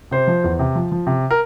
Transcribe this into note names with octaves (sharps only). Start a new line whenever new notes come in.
C3 C5
F3
E2
C3
F3
F3
C3
A#4